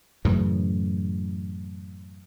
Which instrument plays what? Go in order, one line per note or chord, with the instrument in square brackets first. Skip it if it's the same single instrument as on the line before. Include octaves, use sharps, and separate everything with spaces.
[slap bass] F#2 A2 C#3 E3